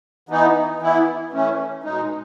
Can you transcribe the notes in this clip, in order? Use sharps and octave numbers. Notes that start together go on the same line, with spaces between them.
E3 B3 D#4
E3 B3 E4
E3 A3 C#4
B2 G#3 D#4